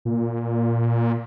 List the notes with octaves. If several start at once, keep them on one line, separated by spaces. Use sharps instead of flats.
A#2